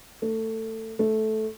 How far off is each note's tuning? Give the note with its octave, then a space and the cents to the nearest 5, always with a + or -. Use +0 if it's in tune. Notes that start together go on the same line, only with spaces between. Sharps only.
A3 +20
A3 -10